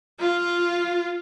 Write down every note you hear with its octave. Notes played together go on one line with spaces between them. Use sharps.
F4